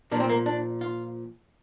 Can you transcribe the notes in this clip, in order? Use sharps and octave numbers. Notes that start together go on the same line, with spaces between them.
A#2 F3 D4
C4
A#3
D4
F4